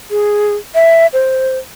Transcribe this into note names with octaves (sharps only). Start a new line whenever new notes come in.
G#4
E5
C5